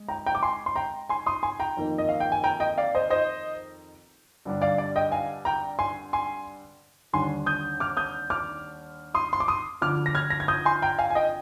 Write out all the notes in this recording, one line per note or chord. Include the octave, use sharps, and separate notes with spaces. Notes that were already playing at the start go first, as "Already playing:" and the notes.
Already playing: G#3
G5 A#5
G5 A#5
D6
G#5 C6
C6
G5 A#5
G#5 C6
C6 D#6
G#5 C6
G5 A#5
F2 D#3 A#3 D#4
D#5
F5
G5
G#5
G5 A#5
D#5 G5
D5 F5
C5 D#5
C5 D#5
G2 D3 G3 D4
D5 F5
D5
D#5 G5
F5 G#5
G5 A#5
G#5 C6
G#5 C6
D#2 D3 G3 D4 G#5 C6
D#6 G6
D6 F6
D#6 G6
D6 F6
C6 D#6
C6
D6
C6 D#6
D2 D3 F3 D6 F6
A#6
F6 G#6
A#6
G#6
D#6 G6
G#5 C6
G5 A#5
F5 G#5
G#5
D#5 G5